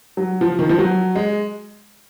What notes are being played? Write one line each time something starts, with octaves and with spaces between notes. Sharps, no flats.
F#3
F3
D#3
F3
F#3
G#3